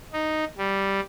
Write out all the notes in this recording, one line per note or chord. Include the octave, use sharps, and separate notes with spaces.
D#4
G3